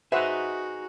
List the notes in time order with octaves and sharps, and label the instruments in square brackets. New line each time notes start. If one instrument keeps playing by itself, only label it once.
[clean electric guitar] D#4 G#4 [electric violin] F#4 [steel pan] B4 C5 F#5 [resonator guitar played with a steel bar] E5